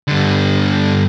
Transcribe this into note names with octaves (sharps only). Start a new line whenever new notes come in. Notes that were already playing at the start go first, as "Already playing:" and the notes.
G2 D3